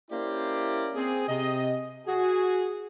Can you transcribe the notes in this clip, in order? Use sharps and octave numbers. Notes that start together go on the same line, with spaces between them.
A#3 C#4 E4 G4 C5 D5
C4 G#4
C3 D#5
F#4 G#4